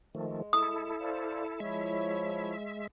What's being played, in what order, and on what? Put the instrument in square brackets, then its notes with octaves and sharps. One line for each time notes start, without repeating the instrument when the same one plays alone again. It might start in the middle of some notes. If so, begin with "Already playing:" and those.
[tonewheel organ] D#3 F3 A3 [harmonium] G#3
[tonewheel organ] E4 A4 [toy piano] D#6
[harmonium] C5 D5 F5
[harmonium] F3 E4 C#5 [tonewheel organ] G#3 E5